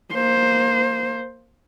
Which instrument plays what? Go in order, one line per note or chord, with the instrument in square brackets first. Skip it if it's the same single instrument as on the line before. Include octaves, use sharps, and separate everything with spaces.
[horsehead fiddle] A#3 C5